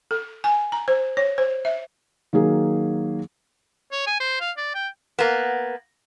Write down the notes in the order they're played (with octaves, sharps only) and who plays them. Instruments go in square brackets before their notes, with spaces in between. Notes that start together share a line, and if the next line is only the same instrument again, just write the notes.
[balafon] A4
G#5
A#5
C5
C#5
C5
E5
[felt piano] D#3 F#3 A#3 G#4
[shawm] C#5
G#5
C5
F5
D5
G5
[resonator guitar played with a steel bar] A#3 B3